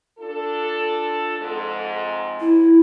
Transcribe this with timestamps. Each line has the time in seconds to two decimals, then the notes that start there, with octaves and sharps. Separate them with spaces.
0.19 D4 F4 A4
1.39 F2 G#2
2.40 E4